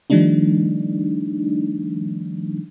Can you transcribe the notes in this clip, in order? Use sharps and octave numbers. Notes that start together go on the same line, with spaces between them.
D#3 F3 G3 A3 D4 D#4